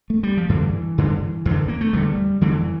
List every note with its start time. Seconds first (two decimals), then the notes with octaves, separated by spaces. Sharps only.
0.10 A3
0.23 G3
0.37 F3
0.49 G2 D3 E3
0.98 G2 D3
1.45 E2 D3
1.68 A#3
1.81 A3
1.93 E2 D3 G3
2.41 F2 D3 E3